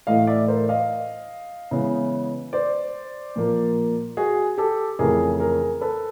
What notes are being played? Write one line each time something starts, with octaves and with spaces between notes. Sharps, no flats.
A2 E3 A3 D#5 F5
D5 E5
A#4 C5
D#5 F5
C#3 E3 G#3 B3
C5 D5
A#2 F3 A#3
F#4 G#4
G4 A4
F2 C#3 E3 A3 G#4 A#4
G#4 A#4
A4 B4